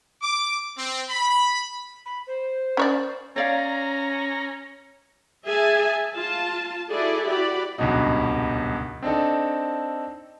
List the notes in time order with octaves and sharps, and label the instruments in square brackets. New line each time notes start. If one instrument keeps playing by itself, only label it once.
[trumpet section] D6
C4
B5
[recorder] B5
C5
[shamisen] C#4 C#5 D5
[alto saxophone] C#4 [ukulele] C#5 D5 F5 [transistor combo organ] A#5
[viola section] G#4 E5 G#5 A5
F4 A5
E4 F#4 G#4 A4 D5
F#4 G4 D5 B5
[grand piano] D#1 C#2 G2 B2 F#3 D#4
C4 D4 D#4 A4